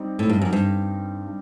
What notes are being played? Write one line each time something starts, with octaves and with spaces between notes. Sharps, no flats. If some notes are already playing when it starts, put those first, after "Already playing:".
Already playing: G3 C4 D#4
A2
G2
F#2
G2